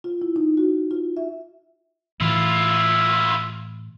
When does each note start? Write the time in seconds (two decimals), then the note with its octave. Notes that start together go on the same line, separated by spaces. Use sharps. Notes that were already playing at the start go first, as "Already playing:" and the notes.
0.04 F4
0.22 E4
0.36 D#4
0.57 F#4
0.91 F4
1.17 E5
2.20 A2 E3 E4 F4